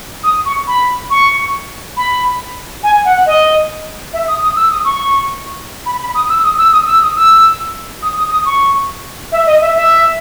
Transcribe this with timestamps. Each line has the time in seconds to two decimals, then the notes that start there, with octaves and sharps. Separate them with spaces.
0.24 D#6
0.45 C#6
0.67 B5
1.10 C#6
1.97 B5
2.83 G#5
3.05 F#5
3.26 D#5
4.13 E5
4.28 D#6
4.42 D#6
4.56 E6
4.71 D#6
4.85 C#6
5.86 B5
6.00 B5
6.15 D#6
6.29 E6
6.43 D#6
6.58 E6
6.72 D#6
6.86 E6
7.01 D#6
7.16 E6
8.02 D#6
8.17 D#6
8.31 D#6
8.46 C#6
9.32 E5
9.46 D#5
9.61 E5
9.75 E5